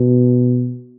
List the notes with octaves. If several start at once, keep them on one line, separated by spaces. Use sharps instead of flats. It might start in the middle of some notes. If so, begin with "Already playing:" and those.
Already playing: B2